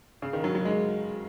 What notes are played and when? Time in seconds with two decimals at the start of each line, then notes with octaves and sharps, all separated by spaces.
0.22 C#3
0.33 D#3
0.44 F#3
0.55 F#3
0.65 G#3